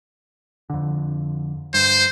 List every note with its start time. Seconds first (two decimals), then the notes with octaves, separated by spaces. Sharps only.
0.70 F2 D3
1.74 G2 C5